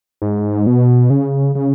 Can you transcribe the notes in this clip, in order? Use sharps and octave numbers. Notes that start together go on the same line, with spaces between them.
G#2
B2
C#3
C#3